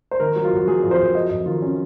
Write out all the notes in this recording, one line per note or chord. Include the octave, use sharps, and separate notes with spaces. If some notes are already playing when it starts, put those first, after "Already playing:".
C5
D#3 A#4
F#3
F4
F2 F#4
F#3 G#4
F2
C5
F2
F#3 D#5
F2 D#5
D#3 F4
C#4